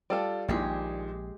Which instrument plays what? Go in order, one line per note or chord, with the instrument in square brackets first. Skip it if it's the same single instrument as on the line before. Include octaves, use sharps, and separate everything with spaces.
[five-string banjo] G3 A5 [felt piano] F4 A4 D5
[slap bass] A#1 [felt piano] A#2 D#3 [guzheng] G#3 G4 G#4